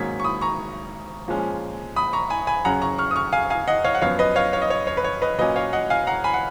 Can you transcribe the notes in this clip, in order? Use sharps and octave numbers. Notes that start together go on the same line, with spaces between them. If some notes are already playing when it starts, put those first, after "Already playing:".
Already playing: G#2 D#3 F#3 A#3 C#4 G#6 B6
C#6
B5 D#6
A#5 C#6
A#2 F3 G#3 C#4
B5 D#6
A#5 C#6
G#5 B5
G#5 B5
F#2 C#3 F#3 C#4 F#5 A#5
A#5 C#6
C#6 F6
D#6
C#6 F6
F5 G#5
F5 G#5
D#5 F#5
C#5 F5
F#5
F#2 F3 B3 C#5 F5
B4 D#5
C#5 F5
C#5 F5
D#5
C#5
C#5
B4
C#5
B4 D#5
A#2 F#3 A#3 C#4 B4 D#5
C#5 F5
D#5 F#5
F5 G#5
F#5 A#5
G#5 B5
F#5